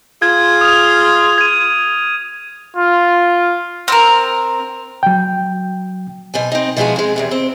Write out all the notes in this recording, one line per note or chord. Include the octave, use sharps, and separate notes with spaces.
F4 G#4 G#6
D#6 F6 F7
G#6 D#7
F4
C4 A#4
F#3 G5
B2 C5 G#5
C4 D#4
B2 F3 G#3 E4 F#4 G#4
G#3 C4
E2 G2 C3
C4